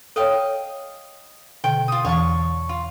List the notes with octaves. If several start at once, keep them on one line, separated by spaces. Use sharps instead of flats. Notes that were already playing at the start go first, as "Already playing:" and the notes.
A4 C#5 D#5 F5 G5
B2 D3 G5
F4 D#6
E2 E3 C#5 A5 C#6
F4